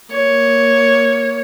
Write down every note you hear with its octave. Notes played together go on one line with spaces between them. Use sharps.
A#3 C#5